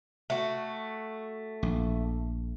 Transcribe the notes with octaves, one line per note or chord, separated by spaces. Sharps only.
A3 F#4
A#1